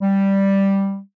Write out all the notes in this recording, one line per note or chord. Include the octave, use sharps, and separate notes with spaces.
G3